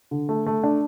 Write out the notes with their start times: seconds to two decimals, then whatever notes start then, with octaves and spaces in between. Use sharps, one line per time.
0.11 D3
0.29 A3
0.46 A3
0.63 D4